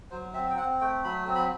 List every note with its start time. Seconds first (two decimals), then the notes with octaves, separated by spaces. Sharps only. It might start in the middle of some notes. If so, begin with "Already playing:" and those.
0.11 F#3 C5
0.34 C4 E5
0.50 G5
0.57 C4 F#5
0.81 A3 G5
1.04 F#3 B5
1.27 C4
1.35 B5